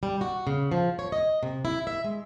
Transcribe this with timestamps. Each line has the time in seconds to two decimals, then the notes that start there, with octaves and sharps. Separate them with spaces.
0.03 G3
0.21 F#4
0.47 C#3
0.72 F3
0.99 C#5
1.12 D#5
1.43 C3
1.65 E4
1.87 E5
2.04 G#3